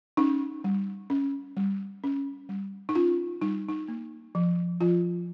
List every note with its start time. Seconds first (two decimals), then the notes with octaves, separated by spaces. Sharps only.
0.17 C#4 D#4
0.64 G3
1.10 C#4
1.57 G3
2.04 C#4
2.49 G3
2.89 D#4
2.95 C#4 F4
3.41 G3 D#4
3.69 D#4
3.88 A#3
4.35 F3
4.81 F3 F4